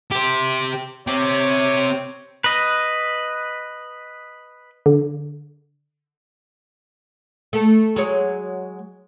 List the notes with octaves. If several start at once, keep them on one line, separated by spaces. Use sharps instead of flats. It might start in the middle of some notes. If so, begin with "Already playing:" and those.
G4 C5
C4 G4 C#5
B4 D#5
D3
A3 A4
F#3 G#3 C#5